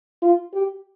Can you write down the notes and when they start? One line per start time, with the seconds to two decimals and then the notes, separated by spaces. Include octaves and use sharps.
0.22 F4
0.53 G4